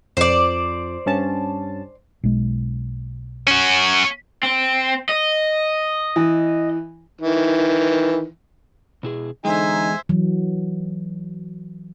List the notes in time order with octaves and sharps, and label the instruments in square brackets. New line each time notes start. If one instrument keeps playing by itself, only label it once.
[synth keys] F2 F3 [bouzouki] C5 D5
[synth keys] G2 C#4 A5
[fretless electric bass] B1 G#3
[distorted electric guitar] C#4 F#4
[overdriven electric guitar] C4
D#5
[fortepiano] E3
[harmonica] D#3 E3
[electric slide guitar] B2 E4 G#4
[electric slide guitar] E2 G#3 [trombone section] D3 D#4 [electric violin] C5 E5 [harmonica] G#5
[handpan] E3 F#3